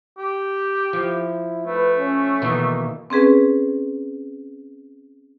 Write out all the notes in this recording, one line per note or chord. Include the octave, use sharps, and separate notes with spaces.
G4
F3 E4
A3 B4
C#4
B2 D#3 E3 A#3
C4 C#4 G#4 B4